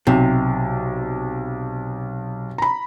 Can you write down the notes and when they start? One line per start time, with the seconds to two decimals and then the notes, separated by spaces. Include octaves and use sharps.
0.07 B1 C3
2.58 A#5 B5